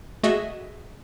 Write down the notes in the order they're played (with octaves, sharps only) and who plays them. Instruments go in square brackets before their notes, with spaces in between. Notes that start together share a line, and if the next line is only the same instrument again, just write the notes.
[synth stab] A3 F#4 G#4 D#5 E5